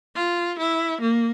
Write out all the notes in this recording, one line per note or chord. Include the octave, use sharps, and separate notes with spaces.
F4
E4
A#3